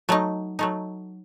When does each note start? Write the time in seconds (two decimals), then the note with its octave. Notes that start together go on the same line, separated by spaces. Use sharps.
0.09 F#3 A3 D#4
0.59 F#3 A3 D#4